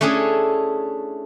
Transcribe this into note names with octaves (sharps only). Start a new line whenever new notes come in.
A3 C#4 D4 E4 G#4